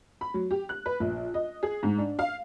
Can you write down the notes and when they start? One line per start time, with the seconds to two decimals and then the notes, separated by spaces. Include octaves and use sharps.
0.21 B5
0.34 F#3
0.51 G4
0.69 F#6
0.86 B4
1.00 A#1
1.34 D#5
1.63 G#4
1.83 G#2
1.98 D4
2.19 F5